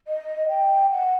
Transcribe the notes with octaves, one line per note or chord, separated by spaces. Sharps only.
D#5
G5
F#5